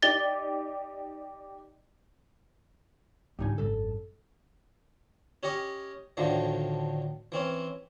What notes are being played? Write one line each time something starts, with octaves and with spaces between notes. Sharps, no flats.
D#4 G4 D5 A6 G7
G#2 D3 G3 D#4 G#5
G#1 F#2 A4
C#4 G4 D#5 C#6
D2 A2 D3 D#3 F3
E3 C4 C#4